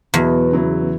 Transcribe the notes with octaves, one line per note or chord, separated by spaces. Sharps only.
E2 B2 F#3 B3 F#4
C#3 F#3 B3 E4